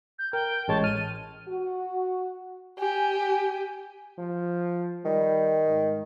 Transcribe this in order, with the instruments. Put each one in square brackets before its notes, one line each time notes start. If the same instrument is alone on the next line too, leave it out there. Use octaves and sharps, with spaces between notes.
[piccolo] G6
[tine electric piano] A#4 [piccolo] G5
[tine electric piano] A1 G#3 C#5 [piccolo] A5
[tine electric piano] F6 [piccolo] D#7
[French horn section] F#4
[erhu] G4 [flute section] G#5
[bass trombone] F3
[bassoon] D#3 [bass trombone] G3
[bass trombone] G#2